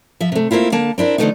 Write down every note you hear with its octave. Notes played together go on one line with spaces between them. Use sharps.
F3 E5
C3 A3
A3 A#3 C4 E4 F4
D3 A#3 A5
C4 D4 E4 A#4
D3 F3 F#3 A3 B3 D#4